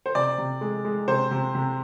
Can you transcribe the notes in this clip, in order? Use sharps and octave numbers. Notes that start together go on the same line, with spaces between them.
C5
C3 D5
C3
G#3
G#3
C3 C5
C3
C3